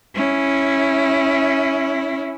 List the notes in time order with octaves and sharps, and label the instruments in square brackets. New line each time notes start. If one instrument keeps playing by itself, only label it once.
[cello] C#4 E4